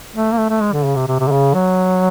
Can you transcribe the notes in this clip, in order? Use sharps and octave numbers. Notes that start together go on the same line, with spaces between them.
A3
A#3
A3
A3
G#3
D3
C#3
C3
C3
C3
D3
C#3
F#3